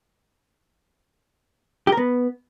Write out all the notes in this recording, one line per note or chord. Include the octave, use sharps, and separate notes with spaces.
G4
A#4
B3